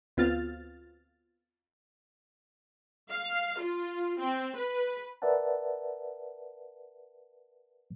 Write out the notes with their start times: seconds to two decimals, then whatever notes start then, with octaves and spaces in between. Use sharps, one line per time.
0.17 D2 B3 C4 F4 F6 A6
3.11 F5
3.60 F4
4.18 C4
4.55 B4
5.22 A#4 B4 D5 E5 F#5 A5